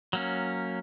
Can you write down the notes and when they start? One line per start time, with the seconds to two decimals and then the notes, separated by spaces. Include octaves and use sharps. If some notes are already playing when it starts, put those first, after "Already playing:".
0.13 F#3 A#3 C#4